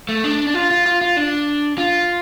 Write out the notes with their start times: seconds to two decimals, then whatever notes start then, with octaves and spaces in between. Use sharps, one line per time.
0.09 A3
0.24 D4
0.47 D4
0.54 F4
0.71 F4
0.86 F4
1.01 F4
1.17 D4
1.78 F4